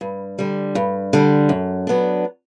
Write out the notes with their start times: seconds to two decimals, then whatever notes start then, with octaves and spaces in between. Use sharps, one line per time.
0.01 G2
0.39 D3 G3
0.75 G2
1.13 D3 G3
1.49 F#2
1.87 F#3 B3 D4